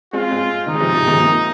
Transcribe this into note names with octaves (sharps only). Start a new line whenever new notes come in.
G#3 C4 F4
G#3 C4
D#3 D#4
G#3
C3 F3
C3 F3
D#3 G#3
F3 A#3